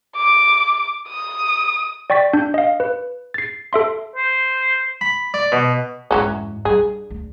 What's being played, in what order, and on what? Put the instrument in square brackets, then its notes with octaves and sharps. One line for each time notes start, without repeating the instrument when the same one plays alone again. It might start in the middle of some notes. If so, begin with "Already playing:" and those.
[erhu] D6
D#6
[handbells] D5 G5 C#6 A6 B6
D4 G6
D#5 F5
B4
A6 C7
A4 E5 C6
[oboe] C5
[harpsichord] B5
D5
B2
[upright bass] F2 G#2 [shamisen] E3 F#3 C#4
[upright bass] G2 G3 [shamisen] G#4
[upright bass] D2